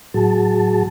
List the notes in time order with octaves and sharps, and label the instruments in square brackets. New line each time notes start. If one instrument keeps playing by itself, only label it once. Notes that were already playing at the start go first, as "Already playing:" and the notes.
[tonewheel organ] A2 F#3 F#4 G#4 A5